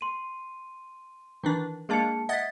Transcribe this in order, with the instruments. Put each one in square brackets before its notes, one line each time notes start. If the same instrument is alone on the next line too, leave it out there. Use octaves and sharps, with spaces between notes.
[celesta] C6 D#7
[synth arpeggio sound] D#3 E3 D4
[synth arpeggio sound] G#3 A#3 D4 [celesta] G#4 A5 C#7
[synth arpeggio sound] D#5 F#5 G#6 [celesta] E5 A6 B6